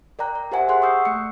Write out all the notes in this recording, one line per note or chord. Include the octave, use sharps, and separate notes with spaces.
A#4 D5 G5 A#5 F#6
D5
G4 A#4 C5 E5 F#5 G#5
G#4 F#5 C6 F#6
C#6 D#6 E6 G6 C7
A3 C#7